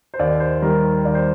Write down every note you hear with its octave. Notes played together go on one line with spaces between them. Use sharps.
C5
D#2 D5
C5
D#3 G3 A#4
D#2 D5
C5